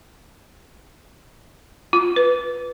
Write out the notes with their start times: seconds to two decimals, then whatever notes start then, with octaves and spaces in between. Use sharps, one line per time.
1.93 F4
2.16 B4